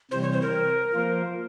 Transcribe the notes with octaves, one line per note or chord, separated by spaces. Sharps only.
C3 E3 G3 C4 C5
C#5
C5
A#4
F3 A#3 F4 C5